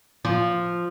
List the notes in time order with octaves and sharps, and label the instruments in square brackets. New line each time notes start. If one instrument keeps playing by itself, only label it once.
[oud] F3